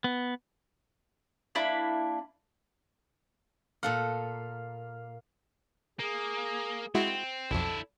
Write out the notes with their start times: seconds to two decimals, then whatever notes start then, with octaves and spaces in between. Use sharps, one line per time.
0.04 B3
1.55 A#3 D4 E4 B5
3.83 A#2 A4 F5 F#5
5.99 A#3 G#4
6.95 G#3 C4 E4 F#4
7.51 B1 F2 D4 E4 A4